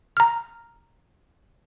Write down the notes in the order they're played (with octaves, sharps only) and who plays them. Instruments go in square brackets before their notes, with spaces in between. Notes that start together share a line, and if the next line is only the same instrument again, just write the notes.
[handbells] A#5 F6